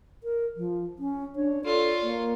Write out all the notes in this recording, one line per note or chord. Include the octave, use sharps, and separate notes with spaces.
A#4
F3
C#4
D4 C#5
F4 A4 C#5 D5
A#3